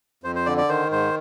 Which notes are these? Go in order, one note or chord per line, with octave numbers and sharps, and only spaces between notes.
F2 C5
C5
D3 D5
D5
D#3 C5
G#2 C5